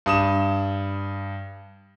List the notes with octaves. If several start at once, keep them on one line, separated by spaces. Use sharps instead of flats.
G2 D#6 E7